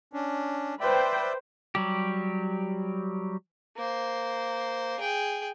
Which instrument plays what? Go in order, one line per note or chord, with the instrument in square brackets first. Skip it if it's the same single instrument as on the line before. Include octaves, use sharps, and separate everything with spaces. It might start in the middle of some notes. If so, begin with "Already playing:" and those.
[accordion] C#4 D4
[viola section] B4 C5 G5 [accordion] D5 E5
[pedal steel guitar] F#3 G3 G4
[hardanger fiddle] A#3 C5
G#4 G5